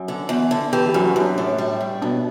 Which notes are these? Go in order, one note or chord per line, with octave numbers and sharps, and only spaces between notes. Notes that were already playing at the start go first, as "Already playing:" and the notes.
Already playing: F#2
D3
E2
D3
E3 G4
G4
F#2
F#4
F#2
D4
A2
G3
A2
B2 D4